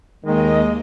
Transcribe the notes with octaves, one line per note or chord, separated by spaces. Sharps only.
D#2 D#3 G#3 A#3 D#5